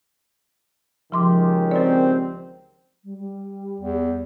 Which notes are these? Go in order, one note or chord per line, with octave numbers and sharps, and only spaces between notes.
C#2 D#3 F3 G4 C6 D6
C4 A#4 D5
G3
G3
E2